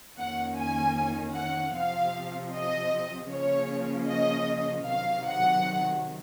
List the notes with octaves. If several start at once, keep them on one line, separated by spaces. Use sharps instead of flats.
F2 D#3 A#3 C#4 F#5
G#5
F#5
C3 F3 C4 F5
D#5
C#3 F3 A#3 C#4 C#5
D#5
C3 D#3 F#3 F5
F#5